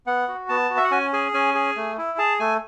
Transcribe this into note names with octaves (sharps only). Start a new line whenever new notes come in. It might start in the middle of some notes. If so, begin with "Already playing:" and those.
B3 F#5
F#4
B3 A5
F#4
E5
F#5
C#4 G#5
G#4 G#5
C#4 G#5
G#4
A3
E4
G#4 A5
A3 G#5